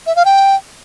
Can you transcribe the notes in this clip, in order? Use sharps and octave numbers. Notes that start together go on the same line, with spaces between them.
E5
F5
G5